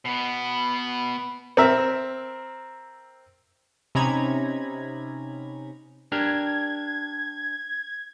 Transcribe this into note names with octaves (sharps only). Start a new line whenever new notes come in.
B2 B3
C4 A#4 E5
C3 C#4 D#4 A#5 B5 G#6
D4 G4 A#4 G#6